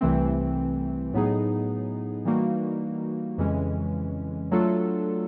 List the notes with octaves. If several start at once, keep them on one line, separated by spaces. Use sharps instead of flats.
C2 C3 E3 A3 C4
A2 F#3 B3 D#4 G#4
E3 G3 A#3 D#4 F#4
F2 C#3 E3 G#3 C#4
F#3 A3 D4 F4 A4